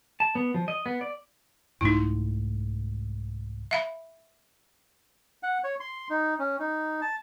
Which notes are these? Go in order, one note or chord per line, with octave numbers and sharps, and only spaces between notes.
A5
B3
F3
D#5
B3
D5
C2 G#2 A3 D#4 E4
E5 F5 B5
F#5
C#5
C6
D#4
C#4
D#4
A5